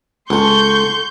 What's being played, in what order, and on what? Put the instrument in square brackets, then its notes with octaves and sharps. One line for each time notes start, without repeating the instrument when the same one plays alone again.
[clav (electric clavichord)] C#2 [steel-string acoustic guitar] A4 F#5 [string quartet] C6 C#6 G6